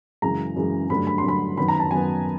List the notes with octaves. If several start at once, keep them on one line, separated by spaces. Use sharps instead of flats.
F#2 C#3 E3 G#3 A#5
F#2 C#3 E3 G#3
G2 D3 F#3 A3 B5
B5
C6
G2 D3 F#3 A3 B5
F#2 D#3 F#3 B3 B5
A#5
A5
F#2 D#3 F#3 B3 G#5